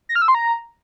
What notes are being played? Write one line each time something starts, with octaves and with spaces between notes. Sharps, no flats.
A#6
F6
E6
C6
A#5